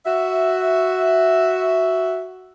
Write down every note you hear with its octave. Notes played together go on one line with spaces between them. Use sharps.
F#4 E5